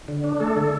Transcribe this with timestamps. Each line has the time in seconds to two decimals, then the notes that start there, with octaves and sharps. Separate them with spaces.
0.08 D3
0.24 D4
0.40 A3 A4
0.57 D3